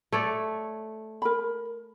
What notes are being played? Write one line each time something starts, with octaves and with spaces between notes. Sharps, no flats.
A3 C#5 D5
A#4 B5